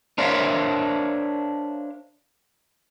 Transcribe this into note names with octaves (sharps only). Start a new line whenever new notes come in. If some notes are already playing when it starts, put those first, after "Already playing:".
D4 A#4 C5 C#5 E5 F5